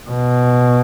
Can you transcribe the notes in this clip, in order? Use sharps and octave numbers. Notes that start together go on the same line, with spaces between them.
B2